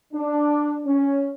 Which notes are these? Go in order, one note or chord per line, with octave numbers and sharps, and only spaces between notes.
D4
C#4